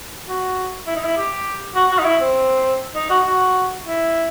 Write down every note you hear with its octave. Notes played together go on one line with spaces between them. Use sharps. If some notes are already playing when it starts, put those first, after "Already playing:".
F#4
E4
D#4
E4
G4
F#4
F#4
D#4
E4
C4
D#4
F#4
F#4
E4